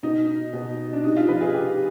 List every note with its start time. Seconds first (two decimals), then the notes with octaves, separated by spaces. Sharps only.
0.03 B2 D#4
0.53 B2
0.93 D4
1.04 C3 D#4
1.17 F4
1.29 F3 B4
1.41 G#4
1.54 C3 G4